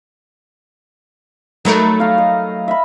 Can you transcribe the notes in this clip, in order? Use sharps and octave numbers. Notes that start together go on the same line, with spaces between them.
F#3 A3 D#4 A#4 B5
F5 A#5
D#5
E5 B5